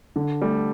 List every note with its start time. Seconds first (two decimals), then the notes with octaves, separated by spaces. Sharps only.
0.16 D3
0.42 G3 A3